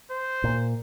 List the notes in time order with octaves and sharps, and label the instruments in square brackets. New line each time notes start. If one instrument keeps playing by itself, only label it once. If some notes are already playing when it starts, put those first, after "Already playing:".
[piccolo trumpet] C5
[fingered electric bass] A#2